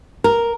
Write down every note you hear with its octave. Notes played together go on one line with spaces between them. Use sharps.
A#4